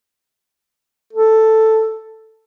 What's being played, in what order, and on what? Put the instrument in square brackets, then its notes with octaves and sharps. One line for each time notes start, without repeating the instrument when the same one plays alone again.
[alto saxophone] A4